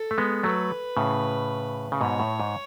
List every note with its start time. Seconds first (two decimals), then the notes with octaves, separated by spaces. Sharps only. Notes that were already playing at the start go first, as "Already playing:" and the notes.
Already playing: A4
0.11 A3
0.18 G#3 B3
0.43 F#3 A3 B4
0.97 A2 C#3
1.92 C#3
2.00 G#2 B2 C#5
2.20 A2
2.40 G#2